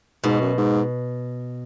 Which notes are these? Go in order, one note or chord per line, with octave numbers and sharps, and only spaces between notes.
G#2 B2
F#2
G#2